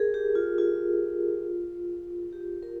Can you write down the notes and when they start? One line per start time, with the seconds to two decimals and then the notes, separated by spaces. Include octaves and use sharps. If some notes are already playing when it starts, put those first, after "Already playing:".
Already playing: G#4 A#4
0.14 G4
0.35 F4
0.58 F4
2.33 G4
2.63 A#4